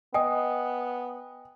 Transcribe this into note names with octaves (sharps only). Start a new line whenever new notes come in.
B3 D#5 G5 G#5 D#6